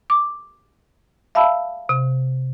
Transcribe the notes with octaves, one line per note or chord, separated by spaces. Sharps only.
D6
E5 F5 A5 B5 E6
C3